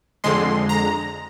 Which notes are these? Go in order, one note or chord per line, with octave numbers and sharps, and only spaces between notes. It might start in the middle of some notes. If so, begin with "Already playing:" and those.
F2 D3 G#3 C6
A#5